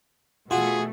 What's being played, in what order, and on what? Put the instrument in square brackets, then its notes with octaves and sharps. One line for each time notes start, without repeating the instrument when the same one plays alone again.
[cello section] B2 E3 A3 [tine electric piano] F4 [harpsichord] F#4 [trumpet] G#4